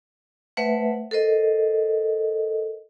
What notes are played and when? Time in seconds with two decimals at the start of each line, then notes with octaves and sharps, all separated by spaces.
0.57 A3 B4 C5 E5 F#5
1.11 A4 A#4 C5 D#5